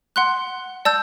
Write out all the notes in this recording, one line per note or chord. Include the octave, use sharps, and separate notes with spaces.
F#5 C6 F#6
D5 A5 E6 G6